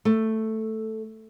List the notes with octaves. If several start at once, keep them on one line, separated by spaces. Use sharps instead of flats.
A3